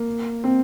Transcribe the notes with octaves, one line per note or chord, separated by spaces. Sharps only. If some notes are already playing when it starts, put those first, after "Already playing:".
Already playing: A#3
C4